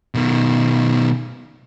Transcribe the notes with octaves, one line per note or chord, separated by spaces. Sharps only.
B2 D#3